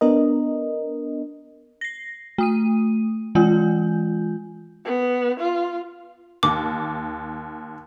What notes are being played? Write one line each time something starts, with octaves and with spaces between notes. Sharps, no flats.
B3 D4 A#4 D#5
A#6 C7
A3 D#6 D#7
E3 G#3 F4 G#5 G6
B3
F4
D#2 D6